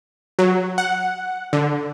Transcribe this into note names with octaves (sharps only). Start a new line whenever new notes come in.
F#3
F#5
D3